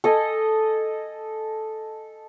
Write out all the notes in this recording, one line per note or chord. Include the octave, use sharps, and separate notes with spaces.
A4 D#5 G#5